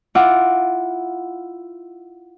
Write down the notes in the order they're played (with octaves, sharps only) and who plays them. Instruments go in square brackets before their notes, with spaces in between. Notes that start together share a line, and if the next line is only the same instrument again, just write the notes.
[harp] E4 F4 F#5 D6